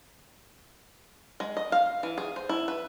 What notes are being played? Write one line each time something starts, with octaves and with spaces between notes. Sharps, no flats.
G#3
D#5
F5
E3
G#4
C5
E4
B4